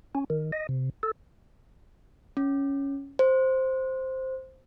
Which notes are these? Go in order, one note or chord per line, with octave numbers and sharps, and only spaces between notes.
C#4
D#3
D#5
C3
A4
C#4
C5